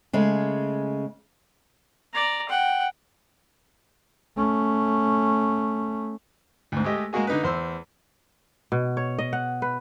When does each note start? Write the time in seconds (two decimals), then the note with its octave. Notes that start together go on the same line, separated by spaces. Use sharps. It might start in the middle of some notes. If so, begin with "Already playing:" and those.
0.13 C#3 G#3 A3
2.13 D5 A#5
2.49 F#5 G5
4.37 A3 C#4
6.72 D2 G#2
6.84 G#3 A3 G4 D#5
7.13 G#3 A#3 F#4 G#4
7.27 D3 D#4 B4
7.43 E2 C5 C6 E6
8.72 B2
8.97 C#5
9.19 D#5
9.33 F#5
9.62 B4